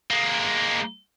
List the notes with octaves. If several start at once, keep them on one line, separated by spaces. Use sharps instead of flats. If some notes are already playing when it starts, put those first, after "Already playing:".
G#3 A#3